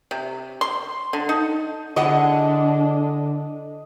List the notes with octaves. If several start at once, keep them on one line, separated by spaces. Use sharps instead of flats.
C3
C6
D3
D#4
D3 D4 E4 G#4 D#5 F#5